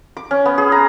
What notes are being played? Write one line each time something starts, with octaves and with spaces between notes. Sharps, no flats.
D6
C#4
B3
G#4
A#5